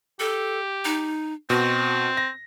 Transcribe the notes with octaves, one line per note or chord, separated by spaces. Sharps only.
G4 A4
D#4
B2 C4 F#4
A#6